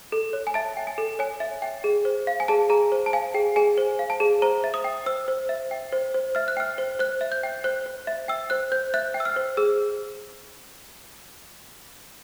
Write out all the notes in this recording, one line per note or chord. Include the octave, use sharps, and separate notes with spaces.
A4
C#5
G#5
E5 A5
G5
G#5
A4
C#5 G#5
E5
G5
G#4
C5
F5
G#5
G#4 A5
G#4 A#5
C5
A5
F5 G#5
G#4 G5
G#4 G#5
C5
F5
A5
G#4
C5 A#5
E5
D#6
G5
C5 E6
C5
E5
G5
C5
C5
E5 F6
F#6
G5 F6
C5
C5 F#6
E5
G6
G5
C5 F#6
C5
E5
G5 E6
C5 F#6
C5 G6
E5 F#6
G5
E6
F6
C5
G#4 E6